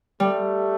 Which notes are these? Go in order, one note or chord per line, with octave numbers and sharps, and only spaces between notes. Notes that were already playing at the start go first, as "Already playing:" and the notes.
G3 A3